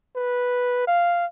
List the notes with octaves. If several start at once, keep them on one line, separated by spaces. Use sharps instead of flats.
B4
F5